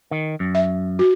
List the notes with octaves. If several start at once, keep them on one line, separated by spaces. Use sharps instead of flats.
D#3
F#2
E5
F#4